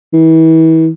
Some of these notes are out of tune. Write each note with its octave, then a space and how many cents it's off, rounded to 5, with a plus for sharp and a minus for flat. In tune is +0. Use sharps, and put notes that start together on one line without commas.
E3 -35